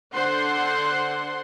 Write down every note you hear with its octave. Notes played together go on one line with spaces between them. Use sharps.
D3 C5 F#5 C6